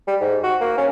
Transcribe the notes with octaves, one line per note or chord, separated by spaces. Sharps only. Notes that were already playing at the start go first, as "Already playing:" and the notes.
G3
G#2
F#4
A#3
C#4